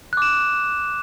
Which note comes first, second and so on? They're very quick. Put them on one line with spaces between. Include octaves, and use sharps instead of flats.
F#6 D6 E7